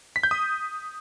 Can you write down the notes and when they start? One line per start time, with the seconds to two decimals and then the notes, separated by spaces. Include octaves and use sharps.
0.16 B6
0.23 G6
0.31 D#6